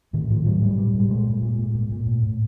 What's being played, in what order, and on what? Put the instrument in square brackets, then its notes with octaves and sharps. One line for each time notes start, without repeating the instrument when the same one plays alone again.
[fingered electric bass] A2 D#3
A2 F3
A2 F#3
A2 G3
A#2 G3
A#2 G3
A#2 G#3
A#2
A#2
A#2
A#2
A#2
A2
A2